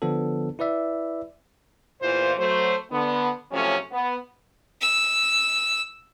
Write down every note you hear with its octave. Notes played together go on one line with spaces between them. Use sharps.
D3 F3 B3 D4 A4
E4 B4 D5 E5
E2 A#2 E3 F4 C5
F#3 A3 C5
D3 B3
C3 F3 F#3 A3 C#4
B3
E6